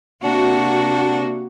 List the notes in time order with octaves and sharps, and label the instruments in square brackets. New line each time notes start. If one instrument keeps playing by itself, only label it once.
[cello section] C3 A#3 F#4 [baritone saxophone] D4